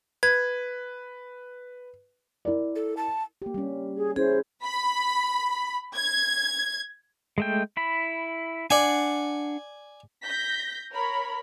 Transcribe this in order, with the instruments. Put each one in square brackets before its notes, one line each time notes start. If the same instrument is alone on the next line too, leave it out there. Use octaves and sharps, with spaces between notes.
[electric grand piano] B4 [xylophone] G#6
[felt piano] E4 A#4 D5
[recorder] A4
A5
[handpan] A#3 G4
G3 C#4
[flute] G#4
[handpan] C#4 E4 [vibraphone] G#4 [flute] C5
[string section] B5
G#6
[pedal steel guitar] G#3 A3 G5
E4 B5
[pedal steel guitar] D4 F#5 [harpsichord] D5 G#5
[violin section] G6 A#6 B6
A#4 C#5 B5